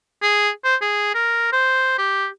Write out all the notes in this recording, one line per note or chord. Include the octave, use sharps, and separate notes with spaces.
G#4
C5
G#4
A#4
C5
G4